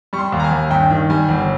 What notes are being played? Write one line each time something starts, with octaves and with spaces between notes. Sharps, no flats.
G3 C#6
C6
D#2
A#5
G#5
D#2
G2 G5
D#3
G3 G#5
G1